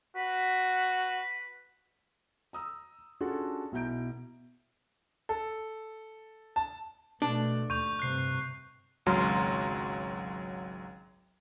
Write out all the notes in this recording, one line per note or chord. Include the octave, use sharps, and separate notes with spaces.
F#4 B4
A#5 D#6 E6
C#4 D4 F4 F#4 G#4 A4
B1 B2 E4 A#5 G6 D7
A4
A5
B2 A3 D4
D#2 C#6 G6 F7
G2 C3 F#6 C7
G#1 C#2 F#3 A#5 C6 F6